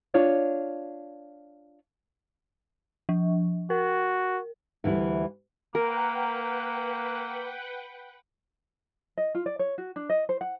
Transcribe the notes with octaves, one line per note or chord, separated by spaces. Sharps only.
D4 F4 C#5
F3
F#4 A#4
D2 E3 G3 E4
A#3 A#4 B4 F#5 G5
D#5
F4
D5
C#5
F#4
D4
D#5
C5
F#5